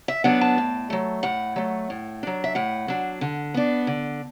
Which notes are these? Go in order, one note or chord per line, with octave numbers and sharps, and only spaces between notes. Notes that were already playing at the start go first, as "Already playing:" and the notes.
E5
F#3 B3 D4 F#5
A5
A2
F#3 A3
A2 F#5
F#3 A3
A2
F#3 D4
E5
A2 F#5
F#3 D4
D3
B3 D4
D3